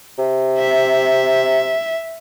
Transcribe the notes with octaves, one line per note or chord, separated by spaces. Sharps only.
C3
E5